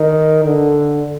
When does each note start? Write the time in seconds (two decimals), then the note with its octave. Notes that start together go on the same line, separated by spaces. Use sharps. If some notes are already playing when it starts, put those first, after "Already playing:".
Already playing: D#3
0.45 D3